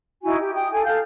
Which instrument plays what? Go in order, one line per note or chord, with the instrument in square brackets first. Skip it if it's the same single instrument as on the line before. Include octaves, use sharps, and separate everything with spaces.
[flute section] D#4 E4 F#4 G#5
G4
G5 D#6
A4 G#5
A4 F5 G6